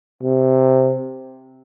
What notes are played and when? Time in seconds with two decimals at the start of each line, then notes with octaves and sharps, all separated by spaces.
0.23 C3